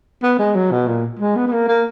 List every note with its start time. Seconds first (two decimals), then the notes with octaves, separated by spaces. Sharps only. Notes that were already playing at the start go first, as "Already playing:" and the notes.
0.23 B3
0.39 G#3
0.55 F#3
0.71 B2
0.87 A#2
1.19 G#3
1.36 B3
1.47 B3
1.52 A#3
1.68 A#3